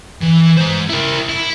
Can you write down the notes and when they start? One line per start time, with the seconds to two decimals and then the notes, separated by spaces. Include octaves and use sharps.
0.21 E3
0.57 G#3 C5
0.90 E4 A#4
1.29 E5 B5